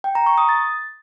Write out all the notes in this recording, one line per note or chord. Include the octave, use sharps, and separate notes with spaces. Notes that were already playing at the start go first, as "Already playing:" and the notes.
G5
A#5
C#6
D#6
A6